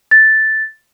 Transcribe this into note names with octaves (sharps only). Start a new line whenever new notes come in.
A6